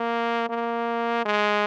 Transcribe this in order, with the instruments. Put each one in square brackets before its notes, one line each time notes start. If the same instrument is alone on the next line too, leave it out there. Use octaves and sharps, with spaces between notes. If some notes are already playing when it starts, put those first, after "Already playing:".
Already playing: [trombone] A#3
A#3
G#3